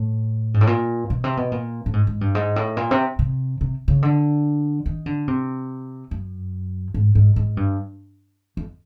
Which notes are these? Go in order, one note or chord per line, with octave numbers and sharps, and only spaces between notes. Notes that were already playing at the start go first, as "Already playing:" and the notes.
Already playing: A2
G#2
A2
A#2
B2
C3
B2
A#2
A2
G#2
G#2
G2
G#2
A2
A#2
C3
C3
C3
C#3
D3
D#3
D3
C3
F#2
G#2
G#2
G#2
G2
F2